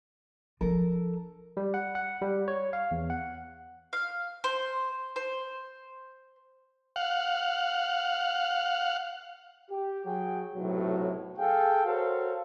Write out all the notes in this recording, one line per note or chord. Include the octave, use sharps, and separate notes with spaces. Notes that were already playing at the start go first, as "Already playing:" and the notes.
F3 D4 A4 A#4
G3
F#5
F#5
G3
C#5
F5
E2
F#5
F5
C5
C5
F5 F#5
G4
F#3 G#4 G5
B1 A2 C3 F#3
G#4 A4 F5 G5
F#4 A4 A#4 C5 C#5 F5